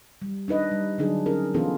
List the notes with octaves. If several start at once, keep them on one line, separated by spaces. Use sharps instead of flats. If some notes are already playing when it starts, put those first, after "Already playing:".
G3
D4 D#4 B4 D#5
G3
D3 F#3 G3 D4 D#4 G#4
C#4 D#4 G#4 A#4
E3 B3 C#4 F4 G#4 A4